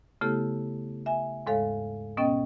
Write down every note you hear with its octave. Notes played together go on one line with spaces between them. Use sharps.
C#3 A3 B3 E4 G4 A4
E5 G#5
D#2 G#2 G#3 A4 C#5 F5
B2 B3 C#4 D#5 G5 A6